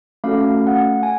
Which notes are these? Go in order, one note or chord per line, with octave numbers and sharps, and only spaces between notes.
A3 C#4 F#4 A4 F5
F#5
G#5